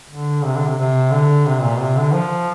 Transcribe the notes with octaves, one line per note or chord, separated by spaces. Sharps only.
D3
C3
D3
C3
C3
D3
C3
A#2
C3
D3
F3